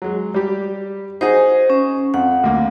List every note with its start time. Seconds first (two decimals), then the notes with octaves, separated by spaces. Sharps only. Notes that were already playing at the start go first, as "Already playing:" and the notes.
0.02 F#3 G#3
0.34 G3 G4
1.21 D#4 F#4 G#4 C5
1.70 C#4
2.14 F2 F#5
2.44 D2 A#3